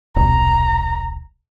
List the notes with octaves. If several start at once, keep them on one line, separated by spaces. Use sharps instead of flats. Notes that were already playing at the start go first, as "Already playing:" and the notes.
D#1 B1 A#5